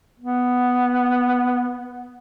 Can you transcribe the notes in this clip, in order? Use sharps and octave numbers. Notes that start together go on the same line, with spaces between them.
B3